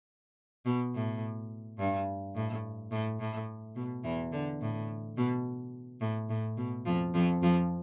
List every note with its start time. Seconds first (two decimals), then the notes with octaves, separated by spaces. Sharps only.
0.66 B2
0.95 A2
1.79 G2
2.35 A2
2.92 A2
3.20 A2
3.76 B2
4.04 E2 E3
4.32 D3
4.61 A2
5.17 B2
6.01 A2
6.29 A2
6.57 B2
6.86 F2 F3
7.14 F2 F3
7.42 F2 F3